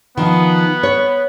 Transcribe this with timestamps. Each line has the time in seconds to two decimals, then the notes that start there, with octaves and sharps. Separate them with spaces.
0.17 D#3 F3 B3
0.83 C#5